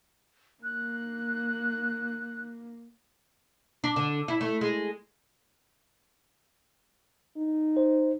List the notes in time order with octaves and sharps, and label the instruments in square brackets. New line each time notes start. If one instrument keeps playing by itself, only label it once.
[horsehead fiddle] A#3 [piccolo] F#6
[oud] D4
D3
E4
A3
G#3
[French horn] D#4
[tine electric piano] C5